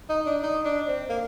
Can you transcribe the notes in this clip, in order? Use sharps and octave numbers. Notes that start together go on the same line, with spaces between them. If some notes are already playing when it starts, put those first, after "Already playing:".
D#4
D4
D#4
D4
C4
A#3